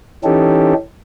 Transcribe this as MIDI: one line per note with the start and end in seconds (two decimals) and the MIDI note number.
0.24 0.74 52
0.24 0.74 61
0.24 0.74 63
0.24 0.74 67
0.24 0.74 69